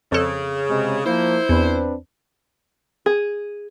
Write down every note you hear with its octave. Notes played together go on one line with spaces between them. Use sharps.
F2 C#3 A4
C3 G#3
F3 A#3 E4 C5
E2 C4 D4 B4
G#4